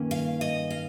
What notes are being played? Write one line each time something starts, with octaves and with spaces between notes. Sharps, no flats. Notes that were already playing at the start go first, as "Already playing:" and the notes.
Already playing: G2 D#3 A#3 C#4
F5
D#5
F5